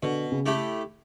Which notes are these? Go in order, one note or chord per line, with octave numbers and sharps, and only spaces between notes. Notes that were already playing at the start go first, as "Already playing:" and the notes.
B2 D3
C#3
A3 E4 G4